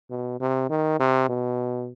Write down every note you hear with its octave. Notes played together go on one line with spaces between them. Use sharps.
B2
C3
D#3
C3
B2